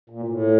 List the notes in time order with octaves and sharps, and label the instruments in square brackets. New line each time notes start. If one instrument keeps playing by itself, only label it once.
[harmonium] A#2
A2